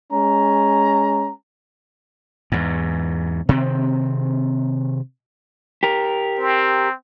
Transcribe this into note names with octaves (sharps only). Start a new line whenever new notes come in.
G#3 C#4 A#5
E2 G#2
C3 D#3 C4
G4 A#4
C4